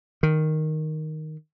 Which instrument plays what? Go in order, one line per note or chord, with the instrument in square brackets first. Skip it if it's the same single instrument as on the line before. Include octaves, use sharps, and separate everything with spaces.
[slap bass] D#3